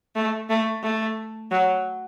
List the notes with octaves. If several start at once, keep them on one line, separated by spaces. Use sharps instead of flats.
A3
A3
A3
F#3